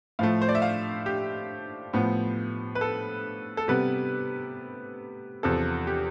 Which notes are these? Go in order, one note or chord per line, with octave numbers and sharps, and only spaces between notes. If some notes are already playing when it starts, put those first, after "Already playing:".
A2 F3 A3 F5
C5
D5
E5
F5
G4
A2 F3 B3
B4
A4
A4
C3 G3 B3 B4
E2 C3 F3 A4
G4